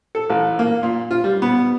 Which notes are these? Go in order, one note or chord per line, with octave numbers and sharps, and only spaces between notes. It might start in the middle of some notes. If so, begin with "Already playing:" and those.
A4
A1
A#3
A#2
F4
G3
B3